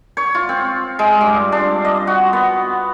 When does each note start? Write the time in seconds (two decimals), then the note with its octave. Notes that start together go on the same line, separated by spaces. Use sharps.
0.17 C#5
0.35 F4
0.49 C4
0.99 G#3
1.21 G2
1.52 D4
1.85 D#5
2.07 F#4
2.33 B3